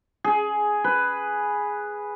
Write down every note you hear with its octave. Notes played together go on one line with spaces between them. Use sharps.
G#4
B4